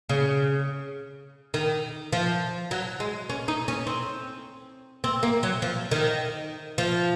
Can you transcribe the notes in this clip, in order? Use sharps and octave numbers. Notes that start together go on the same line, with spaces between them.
C#3
D#3
F3
F#3
G#3
C#4
D#4
C#4
C4
C4
A#3
F#3
F3
D#3
F3